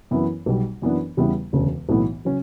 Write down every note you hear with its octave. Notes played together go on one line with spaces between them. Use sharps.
F#2 E3 B3 E4
B1 B2 G3
F#2 E3 B3 D4
E2 C#3 G3 B3 E4
E1 D2 C#3
B1 A2 E3 B3 E4
C#3 F#3 C#4